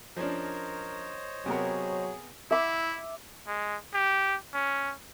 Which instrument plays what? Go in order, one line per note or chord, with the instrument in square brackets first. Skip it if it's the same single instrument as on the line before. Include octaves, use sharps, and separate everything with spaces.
[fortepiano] F3 C#4 D4 [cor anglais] A#4 [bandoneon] C5 C#5 D#5
[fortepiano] C3 B3 A#4 [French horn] F#3 [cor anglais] G#4
[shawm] E4 [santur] E5 D6
[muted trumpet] G#3
G4
C#4